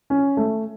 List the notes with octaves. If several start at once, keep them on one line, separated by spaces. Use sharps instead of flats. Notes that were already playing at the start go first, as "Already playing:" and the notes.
C#4
A3